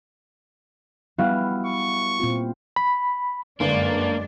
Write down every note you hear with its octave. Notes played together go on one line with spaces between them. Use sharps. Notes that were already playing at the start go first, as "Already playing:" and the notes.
G3 B3 E4 F#4 F5
C#6
A#2 C4 F4
B5
G1 F#2 G#3 A#3 D4